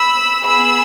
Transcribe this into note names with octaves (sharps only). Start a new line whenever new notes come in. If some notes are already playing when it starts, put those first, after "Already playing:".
Already playing: B5 E6
B3 G#4 B5 E6